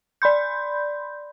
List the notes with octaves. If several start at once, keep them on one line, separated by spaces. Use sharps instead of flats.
D5 B5 C6 G6